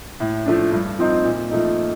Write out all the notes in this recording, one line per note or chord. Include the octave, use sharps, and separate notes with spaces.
A2
F3 A3 D4
G2
F3 C4 D#4
A#2
F3 A3 D#4